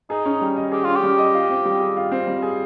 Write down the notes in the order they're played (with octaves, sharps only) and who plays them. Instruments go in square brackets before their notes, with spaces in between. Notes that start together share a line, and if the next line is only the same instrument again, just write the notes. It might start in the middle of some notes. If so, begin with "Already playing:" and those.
[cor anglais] D#4 [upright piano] G#4
[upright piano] C#4
G3
D#5
[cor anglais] G4 [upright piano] G#4
[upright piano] C#4 [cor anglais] F4
[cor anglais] G4
[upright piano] G3
D#5
F4
C4
G3
G#4
F4
C4
G3
G#4